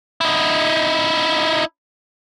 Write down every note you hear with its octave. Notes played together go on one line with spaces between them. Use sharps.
D#4 E4